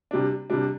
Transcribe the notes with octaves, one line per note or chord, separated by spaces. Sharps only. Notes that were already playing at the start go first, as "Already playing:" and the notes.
C3 G3 D4
C3 G3 D4